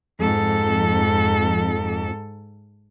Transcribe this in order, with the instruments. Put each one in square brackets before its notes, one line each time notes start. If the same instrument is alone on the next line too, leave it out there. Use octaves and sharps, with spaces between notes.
[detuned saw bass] F2 [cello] G#2 A4